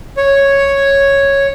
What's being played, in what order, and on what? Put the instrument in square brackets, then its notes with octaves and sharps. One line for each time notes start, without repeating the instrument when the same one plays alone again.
[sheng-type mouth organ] C#5